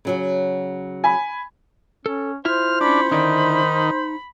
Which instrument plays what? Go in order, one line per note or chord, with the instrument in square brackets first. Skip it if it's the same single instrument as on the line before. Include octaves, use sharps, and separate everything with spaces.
[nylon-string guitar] C#3 F#3 F#4
[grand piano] G#5 B5
[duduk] C#4 [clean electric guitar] A4
[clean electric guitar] E4 F4 E5 [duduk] C5 [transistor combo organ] F6
[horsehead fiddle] C#4 B5 [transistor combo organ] D4
[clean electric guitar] D3 E4 D5 [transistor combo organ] D#3 [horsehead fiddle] B5
[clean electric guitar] D#4